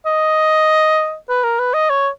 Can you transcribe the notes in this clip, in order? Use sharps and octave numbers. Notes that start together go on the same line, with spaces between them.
D#5
B4
A#4
B4
D#5
C#5